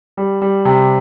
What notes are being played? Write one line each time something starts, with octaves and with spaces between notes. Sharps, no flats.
G3
G3
C3